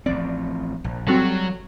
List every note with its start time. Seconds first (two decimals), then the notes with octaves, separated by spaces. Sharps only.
0.06 A1 F3 C4 D5
0.84 A#1
1.08 F#3 G3 C4 F#4 A4